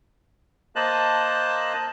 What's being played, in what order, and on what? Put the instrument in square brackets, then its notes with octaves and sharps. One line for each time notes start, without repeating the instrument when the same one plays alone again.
[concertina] A#3 C5 D#5 A5 F#6